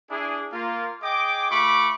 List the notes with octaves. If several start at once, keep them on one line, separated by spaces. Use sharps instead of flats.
D4 E4 G#4
A#3 F4
G#4 D#5 G5 D6
A3 F4 B5 C#6 D6